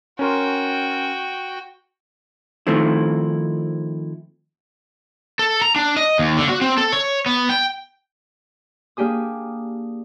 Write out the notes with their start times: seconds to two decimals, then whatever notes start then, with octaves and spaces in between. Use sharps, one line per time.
0.19 C#4 F#4 A#4 G5 C6
2.67 D#3 F3 A3 C4 E4
5.39 A4
5.62 A#5
5.76 D4
5.97 D#5
6.19 D#2
6.37 D3
6.49 F#4
6.61 C4
6.78 A4
6.92 C#5
7.26 B3
7.49 G5
8.97 A#3 D4 G4 G#4 D#6